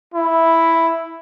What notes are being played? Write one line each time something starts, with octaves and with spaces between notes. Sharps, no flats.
E4